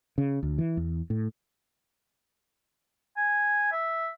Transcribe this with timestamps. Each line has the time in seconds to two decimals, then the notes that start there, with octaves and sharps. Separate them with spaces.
0.18 C#3
0.43 D2
0.58 E3
0.77 E2
1.10 A2
3.17 G#5
3.72 E5